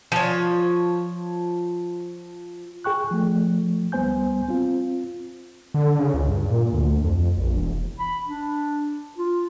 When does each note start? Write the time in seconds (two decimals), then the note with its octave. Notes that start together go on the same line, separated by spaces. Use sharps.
0.12 F3 C#5
2.84 G#4 G5 C#6 F#6
3.11 F3 A3
3.92 C#2 G3 B3 C5 G#5 G6
4.49 C4 F4
5.74 D3
5.99 C#3
6.14 C#2
6.28 G2
6.50 A#2
6.73 D2
7.04 F2
7.37 A#1
7.57 E1
7.99 B5
8.27 D4
9.18 F4